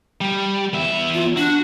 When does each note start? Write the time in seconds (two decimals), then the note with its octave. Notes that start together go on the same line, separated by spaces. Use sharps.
0.21 G3
0.73 E2 E5
1.14 F4
1.37 D4 F#4